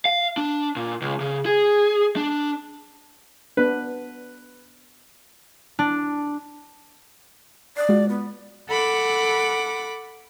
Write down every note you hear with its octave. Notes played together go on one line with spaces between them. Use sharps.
F5
D4
A#2
C#2
C#3
G#4
D4
B3 D4 B4
D4
D5 D#6 F#6 C7
G#3 F4 F#4
B3
A4 F#5 B5 D6